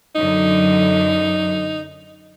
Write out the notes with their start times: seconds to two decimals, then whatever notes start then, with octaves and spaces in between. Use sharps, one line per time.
0.15 F#2 D3 F#3 D#4